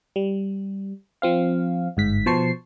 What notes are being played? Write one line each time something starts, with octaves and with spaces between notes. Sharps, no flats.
G3
F3 C4 F5
G1 G#2 B6
B2 F3 C5 A5 C#6 C7